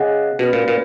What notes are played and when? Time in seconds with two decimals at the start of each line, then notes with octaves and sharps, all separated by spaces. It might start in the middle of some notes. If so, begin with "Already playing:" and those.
Already playing: C#3 G#4 D#5 F#5
0.39 B2 C#4 F#4 B4
0.53 A#2
0.68 A#2